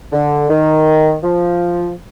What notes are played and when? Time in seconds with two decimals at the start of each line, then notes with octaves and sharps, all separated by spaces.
0.12 D3
0.49 D#3
1.23 F3